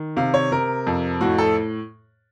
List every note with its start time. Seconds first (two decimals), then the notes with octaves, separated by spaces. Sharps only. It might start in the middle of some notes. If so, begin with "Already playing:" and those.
Already playing: D#3
0.17 C3 F5
0.34 C#5
0.52 C3 A#4
0.87 F2
1.21 A2 F#4
1.38 A4